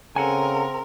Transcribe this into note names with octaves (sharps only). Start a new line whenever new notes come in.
C#3 C4 A4 A#4 F#5 G#5 A#5